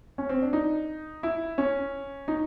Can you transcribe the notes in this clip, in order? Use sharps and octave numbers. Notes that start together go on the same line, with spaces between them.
C#4
C4
D4
D#4
E4
C#4
D#4